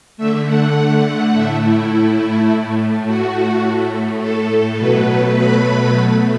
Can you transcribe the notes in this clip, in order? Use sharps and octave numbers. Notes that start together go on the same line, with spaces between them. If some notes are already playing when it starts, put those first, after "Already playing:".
D3 A3 E5
F#5
A2 A3 E5
E4
A2 A3
F#4
A2 A3
A4
A4
B2 F#3 A3 B4
B5
B2 A3